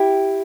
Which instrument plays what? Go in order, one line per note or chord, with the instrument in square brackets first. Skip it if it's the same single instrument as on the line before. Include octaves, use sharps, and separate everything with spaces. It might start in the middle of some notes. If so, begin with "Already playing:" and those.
Already playing: [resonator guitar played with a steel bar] E4 G4